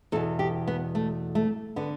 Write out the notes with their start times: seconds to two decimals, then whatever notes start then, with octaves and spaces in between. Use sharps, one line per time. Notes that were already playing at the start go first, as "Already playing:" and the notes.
0.12 E2 B2 A4
0.39 G4
0.67 B3
0.95 A3
1.35 A3
1.76 D3 B3